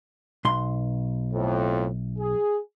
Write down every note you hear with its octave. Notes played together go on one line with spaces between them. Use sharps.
B1 C6
F2 A2
G#4